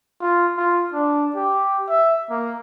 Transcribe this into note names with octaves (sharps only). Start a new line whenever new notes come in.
F4
F4
D4
G4
E5
A#3